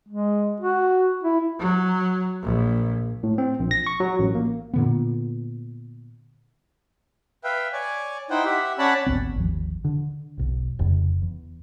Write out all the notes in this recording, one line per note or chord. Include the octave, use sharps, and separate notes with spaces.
G#3
F#4
E4
F#3
A#1
A2
C4
A#1
A#6
C#6
F#3
A1
A#3
A#2 D3 B3
B4 E5 F5 G5
C#5 D5 G#5
D#4 E4 C5 F#5 G5
G4 E5 F#5
C#4 C#5 D5 F#5 A5 B5
G#1 D2 B3 C4
G#1 D#2 F3
D3
E1 B1
F1 F2 C#3
E2